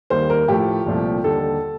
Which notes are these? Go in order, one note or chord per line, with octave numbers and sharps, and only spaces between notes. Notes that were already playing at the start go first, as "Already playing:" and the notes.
D#2 D#3 G3 A#3 C5
A#4
A2 F3 A3 G4
C2 A#2 F3 A3
D#2 D3 G3 A4